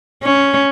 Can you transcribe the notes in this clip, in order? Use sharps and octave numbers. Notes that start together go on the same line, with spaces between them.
C#4